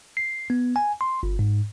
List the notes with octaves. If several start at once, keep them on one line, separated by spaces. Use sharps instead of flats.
C7
B3
G#5
C6
G1
G#2